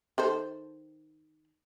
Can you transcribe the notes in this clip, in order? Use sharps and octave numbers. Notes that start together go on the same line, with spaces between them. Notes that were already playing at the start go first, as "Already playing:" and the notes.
D#3 A4 C5